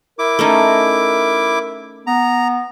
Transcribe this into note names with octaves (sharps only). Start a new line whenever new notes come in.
E4 A#4 D6
A3 C#4 D#4
B3 A#5